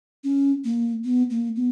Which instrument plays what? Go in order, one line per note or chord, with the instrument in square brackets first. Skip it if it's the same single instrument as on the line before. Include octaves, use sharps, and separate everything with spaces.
[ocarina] C#4
A#3
B3
A#3
B3